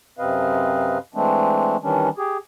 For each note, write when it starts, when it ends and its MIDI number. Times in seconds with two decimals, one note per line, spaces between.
0.18 0.98 42
0.18 0.98 48
0.18 0.98 60
0.18 0.98 71
0.18 0.98 75
0.18 0.98 77
1.14 1.77 52
1.14 1.77 56
1.14 1.77 57
1.14 1.77 60
1.14 1.77 62
1.82 2.09 51
1.82 2.09 52
1.82 2.09 55
1.82 2.09 61
1.82 2.09 62
2.17 2.38 67
2.17 2.38 68